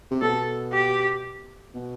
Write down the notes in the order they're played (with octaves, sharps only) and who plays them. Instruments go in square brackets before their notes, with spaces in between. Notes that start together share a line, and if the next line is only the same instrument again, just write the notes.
[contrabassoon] C3
[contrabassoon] B2 [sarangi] A4
[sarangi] G4
[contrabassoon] B2